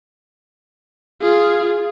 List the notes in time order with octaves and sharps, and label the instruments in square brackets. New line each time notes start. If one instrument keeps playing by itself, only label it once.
[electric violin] F4 G#4